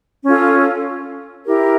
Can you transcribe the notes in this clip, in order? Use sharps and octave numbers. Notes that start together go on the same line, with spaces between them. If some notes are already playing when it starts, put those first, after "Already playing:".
C#4 F4 A4
E4 G4 A#4